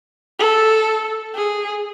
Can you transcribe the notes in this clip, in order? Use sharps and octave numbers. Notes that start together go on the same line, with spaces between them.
A4
G#4